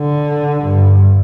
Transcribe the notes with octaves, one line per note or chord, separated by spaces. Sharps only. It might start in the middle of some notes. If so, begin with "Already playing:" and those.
Already playing: D3
G2